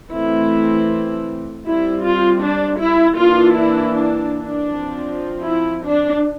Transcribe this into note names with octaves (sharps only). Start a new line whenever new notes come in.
E3 A3 C4 E4
G3 C4 E4
F4
D4
E4
E3 A#3 D4 F4
E4
D4
D4
F3 C4
E4
D4